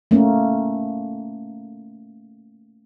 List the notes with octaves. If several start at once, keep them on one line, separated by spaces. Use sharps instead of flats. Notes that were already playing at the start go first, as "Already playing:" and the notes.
A3 A#3 C#4